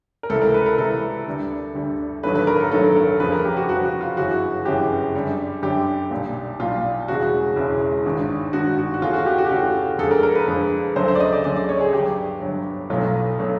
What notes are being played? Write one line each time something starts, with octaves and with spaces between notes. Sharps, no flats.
A#4
C#2 C3 E3 A3 A4
A#4
B4
A#4
C#2 C3 E3 A3 A4
D2 D3 G3
D2 D3 G3
A1 G2 D#3 F#3 A3 B4
B4
A#4
A4
A1 G2 D#3 F#3 A3 A4
A#4
F2 C#3 F3 B4
A#4
G4
F#4
F2 C#3 F3 F#4
F#4
F4
G1 F#2 C#3 E3 F#4
G1 F#2 C#3 E3 G4
F#2 D3 G3
F#2 D3 G3 G4
B1 A#2 G3
B1 A#2 G3 F4
E1 E2 C#3 E3 G#3 F#4
E1 E2 C#3 E3 G#3
G#1 G2 D#3
G#1 G2 D#3 F#4
F#4
F#4
E2 C#3 E3 A3 F4
F#4
G4
F#4
G4
E2 C#3 E3 A3 F#4
F2 D3 F3 G#3 A4
A#4
A#4
B4
F2 D3 F3 G#3
D2 C#3 F#3 A3 C5
C5
D5
D#5
D5
D2 C#3 F#3 A3 D5
D5
C#5
G#4
G1 G2 D3 F#3 G4
G1 G2 D3 F#3
B1 B2 F#3 A3 F4
B2 F#3 A3